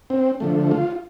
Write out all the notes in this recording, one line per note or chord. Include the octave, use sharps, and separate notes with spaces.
C4
D3 F3 A3
F4